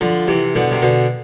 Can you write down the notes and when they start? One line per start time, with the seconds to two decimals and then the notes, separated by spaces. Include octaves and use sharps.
0.01 D3 F3
0.28 C3 E3
0.55 B2 D3
0.71 C3
0.82 B2 D3